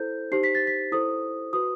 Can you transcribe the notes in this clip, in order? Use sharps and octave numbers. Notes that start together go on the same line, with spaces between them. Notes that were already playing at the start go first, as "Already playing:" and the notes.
Already playing: E4 A4 C5 G6
D#4 G4 C5 C7
B6
A6
B6
E4 A4 C5 D#6
F#4 B4 D#6